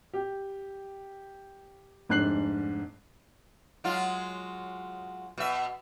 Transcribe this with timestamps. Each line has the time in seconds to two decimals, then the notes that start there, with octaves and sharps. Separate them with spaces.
0.13 G4
2.09 F1 G#2 D4 F#6 C7 F#7
3.84 F#3 G#3 F4
5.38 B2 E5